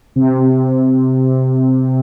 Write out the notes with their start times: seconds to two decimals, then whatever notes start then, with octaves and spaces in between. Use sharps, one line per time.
0.16 C3